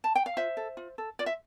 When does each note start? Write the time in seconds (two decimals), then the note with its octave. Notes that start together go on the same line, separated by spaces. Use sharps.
0.04 A5
0.15 G5
0.26 F5
0.37 F4 C5 E5
0.57 A4
0.77 F4
0.98 A4
1.19 F4 D5
1.26 E5